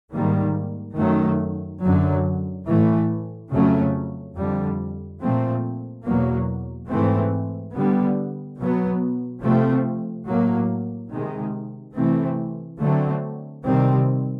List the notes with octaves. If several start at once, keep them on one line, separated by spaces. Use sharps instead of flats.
G#2 D#3 G3 A#3
F#2 D#3 F#3 A3
F#2 D3 F#3
A2 E3 A3
F2 C#3 F#3 A3 C#4
F2 D3 G3
A#2 F3 A3 C4
E2 B2 F#3 A#3
G#2 E3 A3 C4
D3 G3 B3
B2 F#3 B3
C3 F3 A3 C4
A2 F#3 A#3
C3 D#3 G#3
C3 E3 A3 C4
D3 F#3 A3 C4
C3 D#3 G3 C4